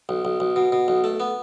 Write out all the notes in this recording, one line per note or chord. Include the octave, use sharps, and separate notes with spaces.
B1
B1
B1
B2
B2
B1
A3
B3